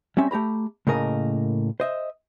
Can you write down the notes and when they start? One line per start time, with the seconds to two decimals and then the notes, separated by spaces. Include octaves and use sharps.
0.17 G3 C4 C#4 E5
0.31 A3 G4 A#5 B5
0.87 A2 C#3 A#3 A#4 D#5
1.80 C5 D#5 E5